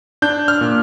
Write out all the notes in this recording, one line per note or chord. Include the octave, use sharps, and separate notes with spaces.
D4 G6
F6
A#2